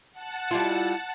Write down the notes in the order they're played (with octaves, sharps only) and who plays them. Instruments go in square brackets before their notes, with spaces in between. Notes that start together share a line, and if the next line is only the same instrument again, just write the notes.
[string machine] F#5 A5
[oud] G3 E4 F4